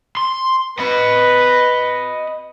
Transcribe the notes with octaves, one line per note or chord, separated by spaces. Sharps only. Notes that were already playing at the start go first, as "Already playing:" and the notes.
C6
B4 D#5 B5